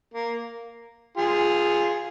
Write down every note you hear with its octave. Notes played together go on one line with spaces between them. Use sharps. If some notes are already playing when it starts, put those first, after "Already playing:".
A#3
F4 G#4